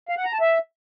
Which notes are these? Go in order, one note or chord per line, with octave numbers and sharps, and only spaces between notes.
F5
F#5
A#5
A5
E5